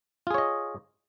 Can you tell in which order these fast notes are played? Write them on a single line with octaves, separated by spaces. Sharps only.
F4 G#4 C#5 D#5